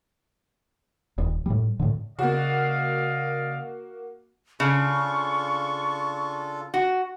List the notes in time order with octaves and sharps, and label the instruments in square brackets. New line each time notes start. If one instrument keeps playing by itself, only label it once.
[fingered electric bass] D#1
A2 G3
A2 D3
[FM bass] C#3 [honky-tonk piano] A#3 F#4 [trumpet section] D5 D#5 F5
[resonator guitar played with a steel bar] C#3 [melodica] D4 F4 A4 [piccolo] C#6
[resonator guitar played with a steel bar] F#4